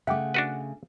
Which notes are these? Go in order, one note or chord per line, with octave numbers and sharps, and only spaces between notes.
C#3 A3 E5 F#5 G5 D6
D4 F#4 B4